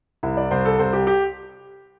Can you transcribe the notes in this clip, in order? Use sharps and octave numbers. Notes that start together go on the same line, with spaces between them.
C2 E4
D5
C2 C5
A4
C2 C5
G4
G4